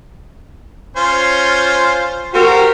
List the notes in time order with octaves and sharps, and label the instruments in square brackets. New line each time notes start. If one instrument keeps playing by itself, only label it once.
[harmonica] C#4 F4 C5
[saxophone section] F#4 A#4 [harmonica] G4 C5